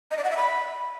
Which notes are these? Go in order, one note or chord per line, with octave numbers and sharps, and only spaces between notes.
D#5
D5
F#5
E5
B5